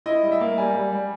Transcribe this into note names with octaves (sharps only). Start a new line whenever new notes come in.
E4 D#5
G3
E5
A#3
G3 G#5
G3
G3